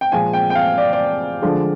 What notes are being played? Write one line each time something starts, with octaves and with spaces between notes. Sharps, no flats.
G5
A#2 F3 G#3 G#5
G5
G5
F5
D5
D5
D3 F3 G#3